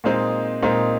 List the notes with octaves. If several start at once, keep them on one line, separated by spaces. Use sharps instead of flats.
A#2 G#3 C4 D#4
A#2 G#3 C4 D#4